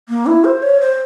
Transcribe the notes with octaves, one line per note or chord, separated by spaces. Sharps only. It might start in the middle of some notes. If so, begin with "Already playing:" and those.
A#3
E4
C5
C#5
C5